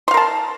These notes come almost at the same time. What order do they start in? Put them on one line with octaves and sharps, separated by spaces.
C6 F5 A#4 A5